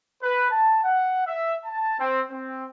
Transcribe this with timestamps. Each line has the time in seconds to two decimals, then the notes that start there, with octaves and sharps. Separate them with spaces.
0.22 B4
0.51 A5
0.82 F#5
1.26 E5
1.65 A5
1.98 C4
2.30 C4